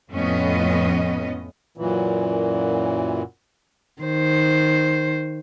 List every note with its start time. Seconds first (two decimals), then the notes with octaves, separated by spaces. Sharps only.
0.10 F2 A2 F3 B3 C#4 D#5
1.77 F#2 A#2 E3
4.02 D#3 C5